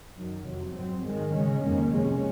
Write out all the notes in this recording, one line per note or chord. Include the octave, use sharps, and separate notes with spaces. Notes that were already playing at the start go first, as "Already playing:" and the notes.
F#2 D#3 F#3
F2 C3 F#3
G#2 F#3 C4
G#2 D#3 G#3
C#3 G#3 C#4
F2 D#3 A#3 C#4
C3 F3 G#3 C#4